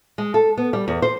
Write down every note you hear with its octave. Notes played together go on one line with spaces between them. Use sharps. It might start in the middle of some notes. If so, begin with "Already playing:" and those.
G#3
A4
B3
G3
E2
C5